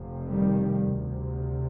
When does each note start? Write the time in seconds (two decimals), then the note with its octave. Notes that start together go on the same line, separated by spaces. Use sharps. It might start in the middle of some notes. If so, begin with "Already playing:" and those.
Already playing: F1 F2 C3
0.28 D#3 G3
0.91 D2 C3